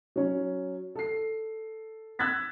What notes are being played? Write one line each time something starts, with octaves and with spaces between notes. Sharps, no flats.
F#3 C#4
A4 C7
E6 F#6 G#6 A6 B6